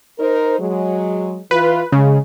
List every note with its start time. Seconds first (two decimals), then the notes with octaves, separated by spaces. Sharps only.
0.19 D#4 A#4 C5
0.59 F#3 G#3
1.51 E3 F4 B4
1.92 C#3 G#3 G#4